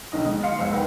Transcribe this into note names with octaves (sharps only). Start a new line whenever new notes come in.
B1 D3 D#3 D#5
G#3
F5 C6 C#7
F#1 C#2 C5 E6
A#3 D#4 B4 F#5 G5